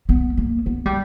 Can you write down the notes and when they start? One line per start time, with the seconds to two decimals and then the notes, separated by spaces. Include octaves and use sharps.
0.09 B3
0.37 A#3
0.66 B3
0.86 G3